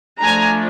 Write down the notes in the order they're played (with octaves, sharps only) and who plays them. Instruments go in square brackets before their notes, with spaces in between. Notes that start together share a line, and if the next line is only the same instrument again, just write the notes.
[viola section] F3 A3 D4 G#5 A#5